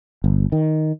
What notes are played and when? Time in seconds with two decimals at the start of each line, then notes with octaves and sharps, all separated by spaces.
0.24 G1
0.52 D#3